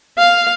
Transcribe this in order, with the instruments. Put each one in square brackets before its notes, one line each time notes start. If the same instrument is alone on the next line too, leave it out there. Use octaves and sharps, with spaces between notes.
[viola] F5